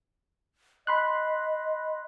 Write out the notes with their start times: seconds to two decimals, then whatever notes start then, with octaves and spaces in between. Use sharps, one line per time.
0.87 D#5 B5 C6 F#6